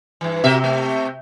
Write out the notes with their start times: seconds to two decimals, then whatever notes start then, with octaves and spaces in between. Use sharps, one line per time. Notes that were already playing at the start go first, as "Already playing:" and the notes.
0.21 G2 E3
0.44 C3 F#4 A#4 E5
0.64 A3